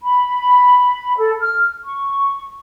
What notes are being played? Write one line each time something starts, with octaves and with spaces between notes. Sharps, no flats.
B5
A4
F6
C#6